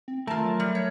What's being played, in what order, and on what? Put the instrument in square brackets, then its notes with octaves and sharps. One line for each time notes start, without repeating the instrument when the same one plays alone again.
[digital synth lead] C4
[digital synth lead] D#3 [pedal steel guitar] A3 A#4 [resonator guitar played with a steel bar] F4 A5
[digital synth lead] F#3
[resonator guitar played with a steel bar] G3
C#5